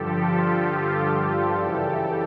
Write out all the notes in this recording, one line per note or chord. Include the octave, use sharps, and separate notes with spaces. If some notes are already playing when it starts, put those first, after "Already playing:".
Already playing: G2 D3 F3 G4 A4
F4 G4
G4 A4
G4 A4
F#2 C#3 E3 G3 G4 A4